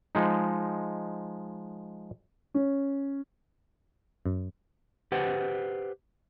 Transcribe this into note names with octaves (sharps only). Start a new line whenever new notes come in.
F3 G#3 D#4
C#4
F#2
G4 B4 C5 F#5